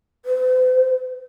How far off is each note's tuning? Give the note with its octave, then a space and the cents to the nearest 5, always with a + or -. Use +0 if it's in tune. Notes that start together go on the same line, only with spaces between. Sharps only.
C5 -45